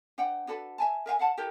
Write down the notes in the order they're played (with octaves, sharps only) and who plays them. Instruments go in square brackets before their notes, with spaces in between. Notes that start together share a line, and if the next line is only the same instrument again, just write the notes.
[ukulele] D4 B4 F#5 G5
D4 F#4 A4 B4
E5 G#5 A5
A#4 E5 F5 G#5
F5 F#5 A5
E4 G4 A4 A#4